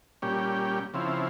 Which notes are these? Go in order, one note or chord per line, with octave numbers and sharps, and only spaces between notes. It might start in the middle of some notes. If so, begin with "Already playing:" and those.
A#2 G3 C#4 G4
C#3 F3 C4 E4